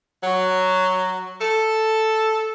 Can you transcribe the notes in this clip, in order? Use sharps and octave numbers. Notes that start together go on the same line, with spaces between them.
F#3
A4